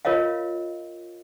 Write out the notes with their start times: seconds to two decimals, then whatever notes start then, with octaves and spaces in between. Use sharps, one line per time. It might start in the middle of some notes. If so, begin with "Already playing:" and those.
0.05 F4 A#4 C#5 D#5 F5